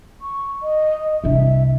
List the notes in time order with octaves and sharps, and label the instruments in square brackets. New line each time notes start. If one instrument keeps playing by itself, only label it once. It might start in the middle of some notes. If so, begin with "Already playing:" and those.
[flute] C#6
D#5
[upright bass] C2 D4 [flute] E5